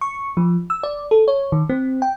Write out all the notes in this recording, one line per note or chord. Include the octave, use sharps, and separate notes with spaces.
C#6
F3
E6
D5
A4
C#5
D#3
C4
G5